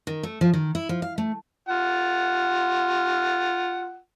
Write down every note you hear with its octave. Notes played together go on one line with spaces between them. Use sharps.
D#3
A3
F3
D#3
E4
F3
F5
A3
F4 F#5